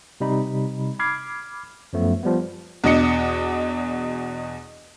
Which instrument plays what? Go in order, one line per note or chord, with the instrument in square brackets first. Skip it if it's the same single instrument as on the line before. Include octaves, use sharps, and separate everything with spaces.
[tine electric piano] C3 G3 D#4 B5
B5 D6 F6 G#6 C7
F#2 F3 A3 B3
F3 G3 B3
[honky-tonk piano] E2 B2 D4 D#5 C#7